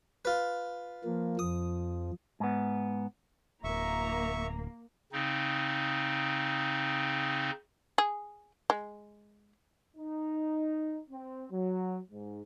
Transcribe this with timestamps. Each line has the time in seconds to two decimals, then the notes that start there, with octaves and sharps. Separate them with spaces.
0.25 F4 B4
1.04 F3 A#3
1.39 F2 F3 D#6
2.40 G#2 B3
3.64 D1 A#3 E5 A#5 C#6
5.13 C#3 C4 D#4
7.98 G#4
8.70 G#3
9.97 D#4
11.10 C4
11.51 F#3
12.11 G#2